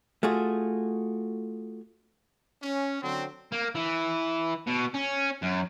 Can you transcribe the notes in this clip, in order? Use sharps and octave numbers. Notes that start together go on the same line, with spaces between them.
A3 F4 F#4 G#4
C#4
D3 F#3 C4
A#3
E3
B2
C#4
F#2